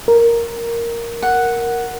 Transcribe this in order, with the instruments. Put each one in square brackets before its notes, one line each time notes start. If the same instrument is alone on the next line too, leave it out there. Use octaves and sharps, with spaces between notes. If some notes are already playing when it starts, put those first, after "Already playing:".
[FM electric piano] A#4
[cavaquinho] F#5